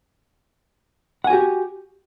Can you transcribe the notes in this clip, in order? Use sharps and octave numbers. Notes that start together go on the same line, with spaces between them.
F#4 G4 F#5 G#5